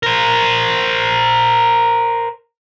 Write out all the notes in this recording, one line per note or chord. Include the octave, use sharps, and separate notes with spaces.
A#4 C5